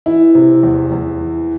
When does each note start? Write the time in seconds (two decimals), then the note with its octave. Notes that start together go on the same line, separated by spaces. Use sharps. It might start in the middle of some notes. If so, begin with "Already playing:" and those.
0.06 E3 E4
0.35 C3
0.63 E2
0.92 E2
1.21 E3